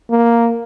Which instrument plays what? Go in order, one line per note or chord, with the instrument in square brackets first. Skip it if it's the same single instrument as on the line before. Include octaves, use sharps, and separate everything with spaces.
[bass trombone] A#3